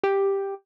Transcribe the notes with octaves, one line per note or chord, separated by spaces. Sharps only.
G4